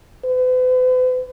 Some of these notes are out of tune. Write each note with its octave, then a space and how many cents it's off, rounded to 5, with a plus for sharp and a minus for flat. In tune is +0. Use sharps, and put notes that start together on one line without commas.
B4 +45